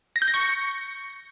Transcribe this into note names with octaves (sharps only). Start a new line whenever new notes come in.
A#6
G6
A#6
C#6
C#7